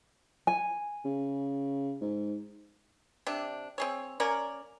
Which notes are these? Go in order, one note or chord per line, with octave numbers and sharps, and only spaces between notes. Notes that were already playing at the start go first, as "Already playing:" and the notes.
G#5
C#3
G#2
C3 D4
C4 G#4 C#5
A#3 C#4 A#4 D5